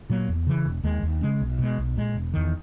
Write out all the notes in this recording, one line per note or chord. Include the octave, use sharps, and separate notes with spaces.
A#2 F#3 A#3
E2
C#3 E3
E1
D#2 D#3 G#3
D#2
C#3 G#3 C#4
B1
B2 G#3
B1
A#2 G#3
E1
E2 D#3